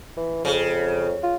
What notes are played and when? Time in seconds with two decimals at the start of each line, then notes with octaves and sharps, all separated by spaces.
0.17 E3
0.45 F2 C#3
1.23 F4